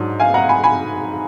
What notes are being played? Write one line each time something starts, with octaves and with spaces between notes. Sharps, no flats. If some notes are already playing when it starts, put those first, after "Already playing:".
Already playing: G#2 F#3 D4
F5 G#5
F#5 A#5
G#5 B5
G#5 B5